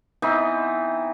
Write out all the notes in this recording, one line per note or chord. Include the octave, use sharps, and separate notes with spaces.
E3 B3 C4 D#4